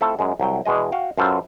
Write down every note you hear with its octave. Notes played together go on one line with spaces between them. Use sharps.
A3 C4 E4 F4 A4
F#2 G#3
C2 F#3 G5
E2 B2 G#3 D#5
F#4 F5 G5
F#2 F#3 F4 A4 B4 C5